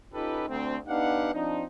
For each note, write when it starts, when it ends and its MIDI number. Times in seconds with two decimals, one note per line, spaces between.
0.14 0.44 61
0.14 0.44 63
0.14 0.44 65
0.14 0.44 67
0.14 0.44 69
0.14 0.44 71
0.48 0.77 38
0.48 0.77 60
0.87 1.30 59
0.87 1.30 62
0.87 1.30 63
0.87 1.30 67
0.87 1.30 77
0.87 1.30 78
1.33 1.64 53
1.33 1.64 60
1.33 1.64 62
1.33 1.64 63